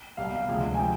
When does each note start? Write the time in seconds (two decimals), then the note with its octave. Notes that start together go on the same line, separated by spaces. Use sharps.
0.17 C2 B2 G3 F5
0.48 D2 C3 F3 G#3
0.74 G#5
0.79 F3 G#3 G5